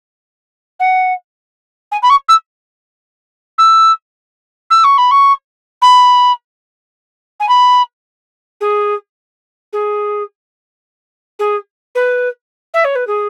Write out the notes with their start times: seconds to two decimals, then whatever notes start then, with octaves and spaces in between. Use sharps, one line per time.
0.79 F#5
1.91 G#5
2.02 B5
2.09 C#6
2.28 E6
3.58 E6
4.70 E6
4.83 C#6
4.97 B5
5.11 C#6
5.81 B5
7.39 G#5
7.48 B5
8.60 G#4
9.72 G#4
11.39 G#4
11.95 B4
12.73 E5
12.84 C#5
12.95 B4
13.07 G#4